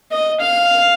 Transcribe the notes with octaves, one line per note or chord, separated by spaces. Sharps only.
D#5
F5